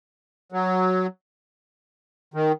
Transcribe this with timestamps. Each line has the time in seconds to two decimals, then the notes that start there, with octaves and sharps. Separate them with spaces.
0.52 F#3
2.34 D#3